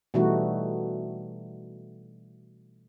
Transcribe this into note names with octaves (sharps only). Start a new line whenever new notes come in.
B2 E3 G3 A3 D#4 F#4